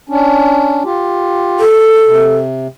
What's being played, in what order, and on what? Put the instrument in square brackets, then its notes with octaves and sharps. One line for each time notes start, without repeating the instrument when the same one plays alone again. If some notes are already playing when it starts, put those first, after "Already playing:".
[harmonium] C#4 D4
F4 G4
[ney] A4
[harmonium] C3